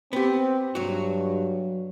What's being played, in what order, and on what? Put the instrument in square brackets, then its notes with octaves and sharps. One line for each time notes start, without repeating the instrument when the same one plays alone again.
[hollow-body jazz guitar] B3 G4 [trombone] C4
[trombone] G2 [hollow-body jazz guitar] F#3 F#4